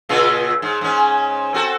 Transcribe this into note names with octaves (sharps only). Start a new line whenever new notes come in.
A#2 C#3 F4
G#2
G#2 C#4
C4 F#4 A4